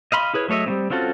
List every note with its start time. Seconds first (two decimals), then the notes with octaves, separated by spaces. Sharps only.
0.12 D#5 F5 B5 C6
0.34 E4 G#4 B4 C#5
0.48 F#3 A3 C#5 D#5 E5
0.66 G3 B3 C4
0.90 C4 C#4 F4 F#4 A4